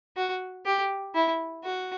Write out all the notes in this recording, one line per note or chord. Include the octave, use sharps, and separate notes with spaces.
F#4
G4
E4
F#4